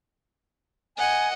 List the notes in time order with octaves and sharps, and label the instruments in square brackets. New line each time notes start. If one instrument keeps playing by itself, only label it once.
[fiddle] D#5 F#5 [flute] G#5